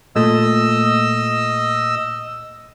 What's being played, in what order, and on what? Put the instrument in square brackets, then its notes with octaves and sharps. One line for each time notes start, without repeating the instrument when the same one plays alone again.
[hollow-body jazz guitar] A#2 A3 [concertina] D#5 E6